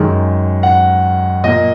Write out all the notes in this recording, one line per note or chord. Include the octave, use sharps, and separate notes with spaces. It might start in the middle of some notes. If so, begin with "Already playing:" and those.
Already playing: F#2 D#3 G#3
F#5
A#2 A#3 D#5